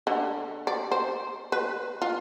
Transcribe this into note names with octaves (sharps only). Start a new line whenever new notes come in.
D3
D5
C5
B4
F4